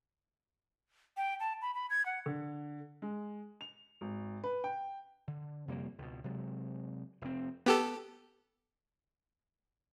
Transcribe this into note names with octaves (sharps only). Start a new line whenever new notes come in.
G5
A5
B5
B5
G#6
F#5
D3
G#3
F7
G#1
B4
G5
D3
F2 C3 G3 A#3
C#2 B2
C3 F#3 G#3
F1 C4
B3 G4 A4